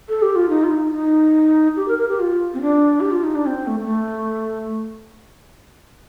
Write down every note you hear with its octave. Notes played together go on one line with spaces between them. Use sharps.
A4
G4
F4
D#4
F4
D#4
D#4
G4
A#4
A#4
G4
F4
C4
D4
G4
F4
D#4
D4
C4
A3
A3